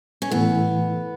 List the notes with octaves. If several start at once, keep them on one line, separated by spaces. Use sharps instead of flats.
C#4
A2 E3 A3 B3 E4 A4